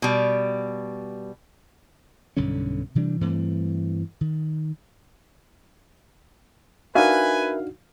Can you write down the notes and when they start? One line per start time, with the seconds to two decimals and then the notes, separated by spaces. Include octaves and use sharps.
0.02 B2 G3
2.37 B1 G2 D3 C#4
2.95 C3 E3 G3 D4
3.21 G2 E3 A3 C4
4.21 D#3
6.95 D4 D#4 F#4 A#4 B4 E5 F5 G#5